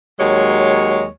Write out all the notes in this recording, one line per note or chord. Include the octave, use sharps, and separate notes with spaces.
D#2 F#3 G#3 C#5